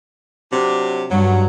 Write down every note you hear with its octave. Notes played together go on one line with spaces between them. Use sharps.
C3 F#3 D4
G2 F#3